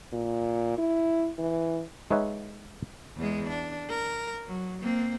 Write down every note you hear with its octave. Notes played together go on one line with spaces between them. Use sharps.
A#2
E4
E3
G#3 D#4 B4 C#5 E5 F#5
E2 G#3
D4
A#4
F#3
A#3 C4